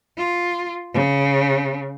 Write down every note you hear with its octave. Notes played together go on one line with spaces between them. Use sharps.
F4
C#3